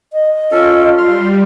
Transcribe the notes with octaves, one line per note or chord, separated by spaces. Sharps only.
D#5
C#4 F4 A4
G3 C6 F6